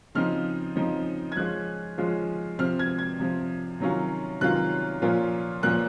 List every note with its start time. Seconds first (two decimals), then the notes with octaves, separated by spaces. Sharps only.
0.15 C#3 F3 C4 D#4 F6
0.75 C#3 F3 C4 D#4
1.32 G#6
1.36 F3 G#3 C#4 F4 F#6
1.98 F3 G#3 C#4 F4
2.59 C3 F3 C4 F6
2.79 G#6
2.99 G#6
3.19 C3 F3 C4
3.80 C3 D#3 F#3 C#4 F4
4.41 C3 D#3 F#3 C#4 F4 F#6
5.02 A#2 F3 A#3 C#4 F4
5.63 A#2 F3 A#3 C#4 F4 F#6